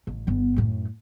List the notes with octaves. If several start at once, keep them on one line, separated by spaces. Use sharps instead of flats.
A1
G1 B3
F#2 A2